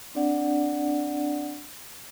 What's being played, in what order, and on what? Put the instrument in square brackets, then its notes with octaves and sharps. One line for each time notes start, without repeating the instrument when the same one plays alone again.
[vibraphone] C4 D4 D5 F#5